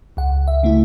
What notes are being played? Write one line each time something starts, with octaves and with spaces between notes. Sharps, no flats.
C#2 F#5
E5
C#3 A3 E4